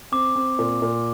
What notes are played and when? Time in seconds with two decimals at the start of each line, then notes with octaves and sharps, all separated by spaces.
0.12 C4 D6
0.35 C4
0.59 A#2
0.82 A#2